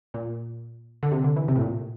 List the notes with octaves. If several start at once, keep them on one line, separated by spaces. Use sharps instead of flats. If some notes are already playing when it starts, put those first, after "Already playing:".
A#2
D3
C3
D3
E3
C3
A2
A#2